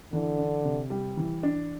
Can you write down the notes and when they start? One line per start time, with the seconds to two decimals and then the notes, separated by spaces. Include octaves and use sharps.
0.13 D3 E3
0.38 D4
0.65 C3
0.90 G3
1.17 E3
1.43 D4